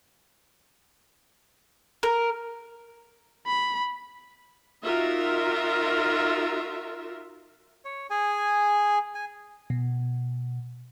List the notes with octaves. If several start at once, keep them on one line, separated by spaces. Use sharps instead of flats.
A#4
B5
D#4 F4 F#4 A#4 E5
C#5
G#4 G#5
G#5
B2